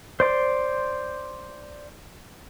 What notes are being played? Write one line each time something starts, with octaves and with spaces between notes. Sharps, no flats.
C5 D5 C6